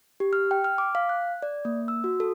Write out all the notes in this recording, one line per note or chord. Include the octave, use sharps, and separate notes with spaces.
G4
F6
G5
F6
D6
F5
F#6
D5
A#3
E6
F#4
A4